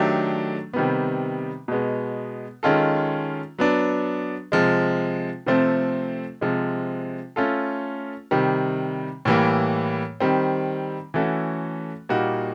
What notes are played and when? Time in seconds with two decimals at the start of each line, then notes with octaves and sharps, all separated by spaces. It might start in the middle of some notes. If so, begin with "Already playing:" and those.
Already playing: D#3 F#3 A3 D4 G4
0.74 C3 D#3 G3 B3
1.68 B2 G#3 B3
2.63 D#3 G#3 C#4 F4 A4
3.58 F#3 B3 D4
4.52 C3 F3 G#3
5.46 C3 F3 A3 C4
6.41 C3 F3 G#3
7.36 A3 C#4 F4 A4
8.31 C3 D#3 G3
9.25 A2 E3 G3 A#3
10.20 D#3 G3 C4
11.14 E3 A3 C#4 F#4 A4
12.09 A#2 G3 A#3 D#4 F#4